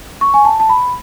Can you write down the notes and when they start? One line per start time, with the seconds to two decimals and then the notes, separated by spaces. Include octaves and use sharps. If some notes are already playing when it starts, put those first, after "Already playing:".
0.21 C#6
0.34 G#5
0.45 A5
0.60 A5
0.69 B5